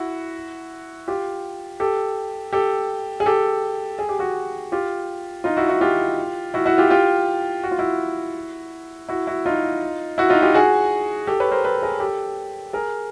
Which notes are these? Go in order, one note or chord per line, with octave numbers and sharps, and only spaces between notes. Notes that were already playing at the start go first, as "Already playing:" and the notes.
Already playing: E4 F#4
F4 G4
G4 A4
G4 A4
G#4
G4 A4
G#4
G4
F#4 G#4
F4 G4
D#4 F4
E4 F#4
E4 F#4
F4 G4
E4 F#4
E4 F#4
F4 G4
F4 G4
F#4
F4
E4 F#4
E4 F#4
E4 F#4
D#4 F4
E4 F#4
D#4 F4
F4 G4
F#4 G#4
G4 A4
B4 C#5
A#4 C5
A4 B4
G#4 A#4
G4 A4
G#4 A#4